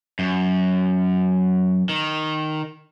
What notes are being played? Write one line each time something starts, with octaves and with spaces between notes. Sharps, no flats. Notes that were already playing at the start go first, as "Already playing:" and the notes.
F#2
D#3